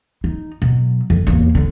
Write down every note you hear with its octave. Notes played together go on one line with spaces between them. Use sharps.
D#4
B2 F#3
F2
E2 A#3
D3